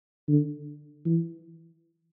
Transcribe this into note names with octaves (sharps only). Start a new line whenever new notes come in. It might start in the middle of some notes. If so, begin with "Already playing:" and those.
D3
E3